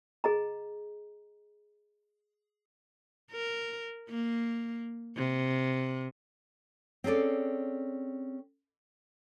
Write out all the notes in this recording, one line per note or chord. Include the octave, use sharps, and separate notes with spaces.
G#4 D#5 A#5
A#4
A#3
C3
C4 C#4 G#4 A4 D5